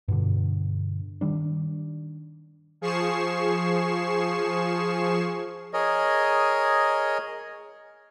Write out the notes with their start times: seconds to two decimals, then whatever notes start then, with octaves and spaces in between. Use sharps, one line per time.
0.08 G2 B2 D3
1.21 D#3 G3 D4
2.81 F3 G#4 C#6 C7 E7
5.73 G#4 A#4 C#5 D#5